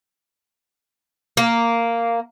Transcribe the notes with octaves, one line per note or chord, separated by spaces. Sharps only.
A#3